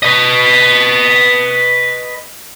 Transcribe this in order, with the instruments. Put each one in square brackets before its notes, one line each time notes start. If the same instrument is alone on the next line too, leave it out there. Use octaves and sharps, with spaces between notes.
[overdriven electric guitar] B4 D#5